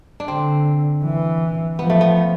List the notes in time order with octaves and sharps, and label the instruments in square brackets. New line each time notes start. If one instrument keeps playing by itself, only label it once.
[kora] D4
[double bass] D3 [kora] C4
[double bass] E3
[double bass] F3 [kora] B3
[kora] A3
B3